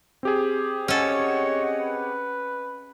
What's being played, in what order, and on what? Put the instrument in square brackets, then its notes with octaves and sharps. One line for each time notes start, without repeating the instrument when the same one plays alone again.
[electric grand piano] C4 G4 G#4
[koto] C#4 A4 [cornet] C#5 [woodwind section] D#5 F#5
[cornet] B4